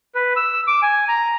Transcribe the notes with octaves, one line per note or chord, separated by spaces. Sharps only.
B4
E6
D6
G#5
A#5